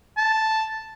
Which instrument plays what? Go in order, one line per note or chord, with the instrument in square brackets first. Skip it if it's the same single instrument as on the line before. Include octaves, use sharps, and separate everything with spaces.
[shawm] A5